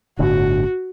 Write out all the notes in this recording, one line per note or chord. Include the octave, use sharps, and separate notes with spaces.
G1 A2 D3 F#4